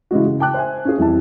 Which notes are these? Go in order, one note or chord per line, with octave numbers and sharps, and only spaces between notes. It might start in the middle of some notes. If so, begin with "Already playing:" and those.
C#3 E3 G#3 F#4
C#3
G5 A5 D6 F#6
C5 E5 G#5
C#4 F4 G#4
F2 E3 G3 E4 E5 A5